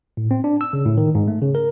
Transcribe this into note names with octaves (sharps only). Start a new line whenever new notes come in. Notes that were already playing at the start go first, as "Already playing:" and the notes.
A2
C4
D4
E6
C#3
A2
D#3
G#2
A3
C#3
A#4